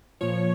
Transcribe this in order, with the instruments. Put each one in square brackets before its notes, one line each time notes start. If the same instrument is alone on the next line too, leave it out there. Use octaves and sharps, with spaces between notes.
[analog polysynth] A#2 F3 C#5